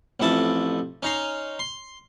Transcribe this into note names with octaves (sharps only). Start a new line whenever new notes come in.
A1 F2 E4 A5 D#6
C#4 D#4 A#5 C6
C6